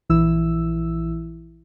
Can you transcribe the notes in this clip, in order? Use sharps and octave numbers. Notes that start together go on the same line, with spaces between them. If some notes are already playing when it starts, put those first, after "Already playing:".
A#1 E3 E4 E6